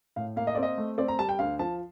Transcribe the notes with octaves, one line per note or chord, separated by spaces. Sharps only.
A2 F5
A#3 F5
D#5
C4 D5
D#5
A3
C4 D5
A#5
G3 A5
G5
D2 F5
F3 A5